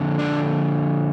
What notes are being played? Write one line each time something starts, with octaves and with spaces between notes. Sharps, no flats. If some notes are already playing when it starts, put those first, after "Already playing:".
Already playing: F2 D3
D4